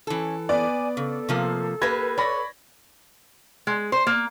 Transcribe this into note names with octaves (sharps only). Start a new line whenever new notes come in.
E3 C#4 A4
B3 D5 G#5
C#3 A4
C3 F3 A#3
A#3 G4 B4 G#6 A#6
C#5 D5 B5 A#6
G#3
C5
A#3